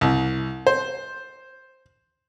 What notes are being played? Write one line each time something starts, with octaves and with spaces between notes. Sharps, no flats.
C2
C5